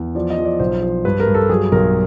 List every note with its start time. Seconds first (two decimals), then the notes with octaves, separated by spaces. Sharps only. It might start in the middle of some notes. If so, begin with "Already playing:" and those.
Already playing: E2
0.15 F3 D5
0.30 D#5
0.38 F3
0.45 D5
0.60 B1 C5
0.82 F3
1.05 G2 B4
1.20 A#4
1.27 G2
1.35 A4
1.49 F#3 G#4
1.72 B1 A#4